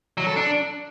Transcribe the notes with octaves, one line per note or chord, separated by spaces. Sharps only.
F#3
A4
D4